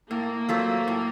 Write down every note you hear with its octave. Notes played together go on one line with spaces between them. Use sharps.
A2 A#3
F#3 A3 C4 F4
A2